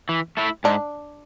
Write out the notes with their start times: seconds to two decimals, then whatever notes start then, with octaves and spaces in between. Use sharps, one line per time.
0.09 E3
0.37 A3 E4
0.64 G#2 D4